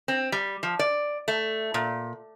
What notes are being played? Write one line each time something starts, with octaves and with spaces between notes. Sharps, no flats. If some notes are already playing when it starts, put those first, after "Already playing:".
C4
G3
F3
D5
A3
A#2